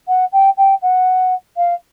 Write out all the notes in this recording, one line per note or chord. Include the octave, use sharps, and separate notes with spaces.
F#5
G5
G5
F#5
F5